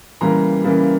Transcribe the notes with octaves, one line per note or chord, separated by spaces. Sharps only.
C#3 E3 G3 A#3 A#5 C6
C#3 E3 G3 A#3